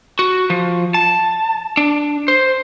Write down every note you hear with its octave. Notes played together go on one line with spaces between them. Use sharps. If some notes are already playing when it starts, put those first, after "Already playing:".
F#4
F3
A5
D4
C5